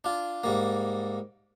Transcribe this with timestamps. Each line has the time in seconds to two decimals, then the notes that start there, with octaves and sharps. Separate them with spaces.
0.04 D4 F4
0.44 G#2 G3 A#3